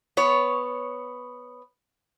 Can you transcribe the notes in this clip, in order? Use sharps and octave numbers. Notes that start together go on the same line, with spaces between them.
B3 C#5